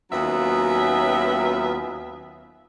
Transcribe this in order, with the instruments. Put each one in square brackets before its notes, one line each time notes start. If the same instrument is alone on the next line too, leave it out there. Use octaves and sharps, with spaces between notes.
[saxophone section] D#2 F#3 B3 C#4 F4 E5